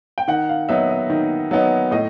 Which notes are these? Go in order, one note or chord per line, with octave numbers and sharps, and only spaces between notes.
G5
D#3 F#5
F5
F#3 B3 D#4 E5
D#5
D#3
F#3 B3 D#4
A2 D#5